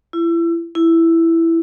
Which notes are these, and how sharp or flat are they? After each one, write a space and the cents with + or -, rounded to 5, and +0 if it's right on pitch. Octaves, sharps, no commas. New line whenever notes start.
E4 +30
E4 +5